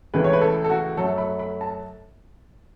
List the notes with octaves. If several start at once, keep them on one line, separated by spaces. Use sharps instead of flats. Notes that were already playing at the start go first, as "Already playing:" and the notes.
C#2 C#3 E3 A3 B4
C#5
B4
A4
A4
F#4
F#2 F#3 A3 A4
B5
B5
A5